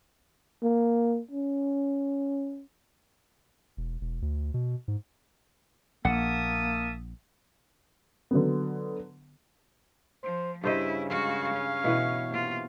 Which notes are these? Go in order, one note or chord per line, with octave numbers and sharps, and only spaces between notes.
A#3
C#4
E1
E1
D2
B2
G#2
A#1 A#3 E5 F#5 A5 D#6
D3 F#3 B3
F3 C5
G2 C#3 E4 C5 D#5
G#3 F#4 C#5 F5
C#4
B2 E3 B3
C3 A#3 F4